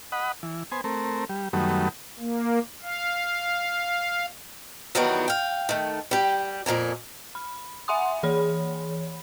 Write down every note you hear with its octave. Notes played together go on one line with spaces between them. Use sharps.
D#5 F#5 B5
E3
B3 C5 G#5
A3 C4 A#4
G3
F#2 D#3 F#3 G3 A3 B3
A#3
F5
E2 D#3 E3 F#3 G3 B3
F5 G5
D#3 A3
G3 G4
F2 A#2 A#3 G#5
B5
E5 F#5 G#5 C6 D#6
E3 G#4 C#5 B5